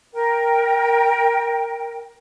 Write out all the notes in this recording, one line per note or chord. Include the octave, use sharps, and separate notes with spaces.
A#4 G5